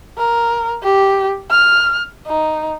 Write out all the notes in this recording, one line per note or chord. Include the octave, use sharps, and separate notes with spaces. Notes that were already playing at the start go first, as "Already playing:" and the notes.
A#4
G4
F6
D#4